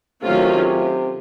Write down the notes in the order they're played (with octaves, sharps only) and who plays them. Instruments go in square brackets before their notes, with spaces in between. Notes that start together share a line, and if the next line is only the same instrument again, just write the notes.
[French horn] C3 [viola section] D#3 F#3 A3 C#4 F4